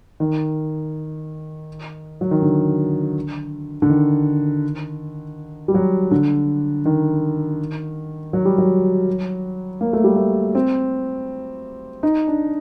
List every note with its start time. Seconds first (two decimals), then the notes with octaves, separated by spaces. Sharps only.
0.20 D#3
2.21 F#3
2.31 D#3
2.42 D3
3.82 D3
3.90 D#3
5.68 G3
5.74 F#3
6.11 D3
6.85 D#3
8.33 F#3
8.45 G3
8.58 F#3
9.81 A#3
9.93 A3
10.04 G3
10.16 A3
10.55 C4
12.03 D#4
12.28 D4